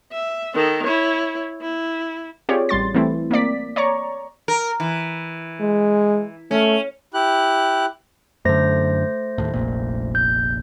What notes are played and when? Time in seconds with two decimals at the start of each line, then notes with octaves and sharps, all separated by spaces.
0.12 E5
0.55 D#3 A4
0.84 E4 C#5
1.62 E4
2.49 C4 F4 G4 G#4 C#5 D5
2.69 A1 G3 C6 A6
2.94 E3 G3 A3 C4 E4
3.31 A#3 C4 D5 B6
3.76 C#5 D5 A#5 C#6
4.48 A#4
4.80 E3
5.60 G#3
6.51 A3 C#4
7.14 E4 G4 F#6
8.45 F#2 D3 A3 C5 A#6
9.38 D#2 A2
9.54 F1 A#1 A#2
10.15 G6